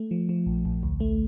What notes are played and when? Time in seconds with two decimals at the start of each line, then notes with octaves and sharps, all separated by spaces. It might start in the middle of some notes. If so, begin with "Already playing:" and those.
Already playing: A3
0.11 F3
0.29 F3
0.46 A#1
0.65 A#1
0.83 D2
1.00 A3